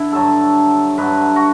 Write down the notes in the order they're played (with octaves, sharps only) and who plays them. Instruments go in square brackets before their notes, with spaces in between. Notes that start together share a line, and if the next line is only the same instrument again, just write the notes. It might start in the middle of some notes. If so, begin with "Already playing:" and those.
Already playing: [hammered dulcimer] D3 D4 E4
G2 F#3 A4
G2 D3 F#3 B4
F#4